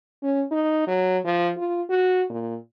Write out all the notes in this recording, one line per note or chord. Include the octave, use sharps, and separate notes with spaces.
C#4
D#4
F#3
F3
F4
F#4
A#2